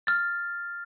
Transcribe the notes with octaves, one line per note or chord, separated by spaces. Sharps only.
F6 A6